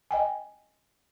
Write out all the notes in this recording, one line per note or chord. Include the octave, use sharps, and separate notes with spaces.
D#5 G5 G#5